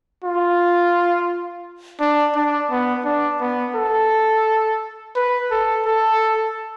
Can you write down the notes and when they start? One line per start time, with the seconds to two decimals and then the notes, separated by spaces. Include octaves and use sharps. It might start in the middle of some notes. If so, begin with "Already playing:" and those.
0.24 F4
2.00 D4
2.36 D4
2.71 B3
3.05 D4
3.40 B3
3.76 A4
5.15 B4
5.51 A4
5.86 A4